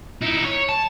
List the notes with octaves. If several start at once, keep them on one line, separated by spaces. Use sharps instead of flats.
D#4 E4
C#5
A5